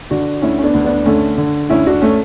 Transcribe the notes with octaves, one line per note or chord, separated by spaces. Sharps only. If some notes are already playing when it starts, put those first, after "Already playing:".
D3 D4 F#4
D2 C#4 E4
C#4
B3 D4
D2
B3 D4
D3 A3 C#4
D3
D2 C#4 E4
D4 F#4
A3 C#4